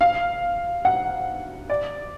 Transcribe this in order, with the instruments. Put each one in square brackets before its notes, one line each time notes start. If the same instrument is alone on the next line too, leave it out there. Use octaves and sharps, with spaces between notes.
[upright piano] F5
F#5
D5